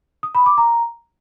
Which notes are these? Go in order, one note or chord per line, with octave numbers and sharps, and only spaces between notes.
D#6
B5
D6
A#5